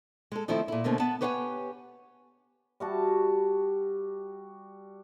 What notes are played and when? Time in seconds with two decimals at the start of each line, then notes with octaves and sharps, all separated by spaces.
0.32 G#3 A4
0.48 D#3 F3 A3 C4 D#4 E4
0.68 A#2 E4
0.84 B2 D3 A3 A#3 C4 C#4
1.00 B3 F#5 A5
1.21 G4 B4 C#5 F5 F#5 G#5
2.80 G3 F#4 A5